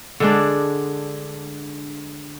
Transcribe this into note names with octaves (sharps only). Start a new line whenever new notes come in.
D3 G#3 D4